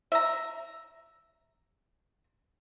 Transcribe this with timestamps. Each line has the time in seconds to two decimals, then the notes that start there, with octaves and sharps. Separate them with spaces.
0.12 E5 A#5